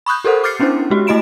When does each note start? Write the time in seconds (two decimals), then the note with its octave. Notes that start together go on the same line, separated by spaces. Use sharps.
0.06 B5 C#6 D#6 F#6 G6
0.24 G4 A4 A#4 C5 F#5
0.44 D6 F6 G6 A6 C7 C#7
0.60 B3 C#4 D4 E4 C5
0.90 G#3 F#4 G4
1.07 A3 E4 D#5 B5 D7 E7